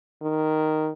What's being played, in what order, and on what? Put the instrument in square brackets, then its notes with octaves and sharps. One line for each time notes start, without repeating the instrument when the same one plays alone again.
[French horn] D#3